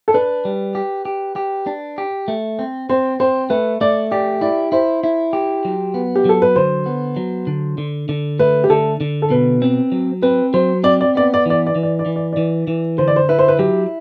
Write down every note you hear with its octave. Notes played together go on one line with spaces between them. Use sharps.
A4
D4 B4
G3
G4
G4
G4
D4
G4
A3
C4
C4 C5
C4 C5
A3 B4
A3 D5
G4 D5
E4 D5
E4 C5
E4
G4
F#3
B3
G4
F#3 A4
B4
D3 C5
B3
F#3
D3
D3
D3
A3 B4
G4
D3 A4
D3
A4
B2 B4
C4
F#3
C4 B4
F#3 C5
C4 D5
D5
B3 D5
D5
E3 D5
D5
E3
D5
D5
E3
D5
E3 D5
E3
D3 C5
D5
C5
E4 B4
C5
B4
F#3 G4